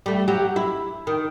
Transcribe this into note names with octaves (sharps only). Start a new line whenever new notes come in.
G3 A3
F#3 G4
E4
D#3